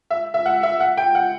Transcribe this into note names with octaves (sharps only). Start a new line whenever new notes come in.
E5
E5
F#5
E5
F#5
G5
F#5